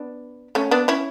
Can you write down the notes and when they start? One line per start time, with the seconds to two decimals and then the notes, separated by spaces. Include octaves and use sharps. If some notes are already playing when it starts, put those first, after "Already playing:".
Already playing: B3 D4
0.55 A3 C#4
0.71 B3 D4
0.88 C#4 E4